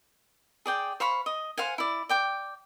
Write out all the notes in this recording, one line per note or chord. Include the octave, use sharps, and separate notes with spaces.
G#4 D5 G5
C5 F5 B5 C#6
D#5
C5 F5 F#5 G#5
E4 D5
D5 G5 D6